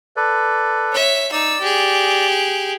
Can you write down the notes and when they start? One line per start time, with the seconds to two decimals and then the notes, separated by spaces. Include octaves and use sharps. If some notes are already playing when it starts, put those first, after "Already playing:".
0.16 A4 B4 D5
0.92 C#5 E5
1.32 D#4 D5 E6
1.61 G4 G#4